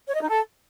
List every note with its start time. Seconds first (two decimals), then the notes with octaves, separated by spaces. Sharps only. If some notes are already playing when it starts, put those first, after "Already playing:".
0.08 C#5
0.15 D#5
0.22 D#4
0.29 A4